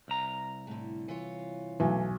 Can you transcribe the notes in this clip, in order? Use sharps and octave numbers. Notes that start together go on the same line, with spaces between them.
C2 A#5
A2 D3
E3 F4 C#5
B1 E3 A3 G#5